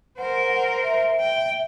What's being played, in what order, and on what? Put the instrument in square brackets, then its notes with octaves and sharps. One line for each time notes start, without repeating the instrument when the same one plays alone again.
[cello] A#4 C5 [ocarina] F#5
[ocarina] E5
[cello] G5